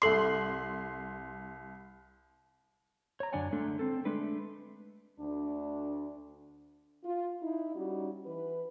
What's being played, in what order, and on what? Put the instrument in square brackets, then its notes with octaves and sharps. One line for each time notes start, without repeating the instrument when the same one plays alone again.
[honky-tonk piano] C2 C6 [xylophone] A4 C7
[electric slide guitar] C#5 A#5
F#2 D3 D4 D5 F#5 G#5
D3 G#3 A3 D4
C4 A4
G#3 A3 D4 B4
[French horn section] D2 D4
F4
D#4 E4
G3 C#4 D#4 F#4
E3 B4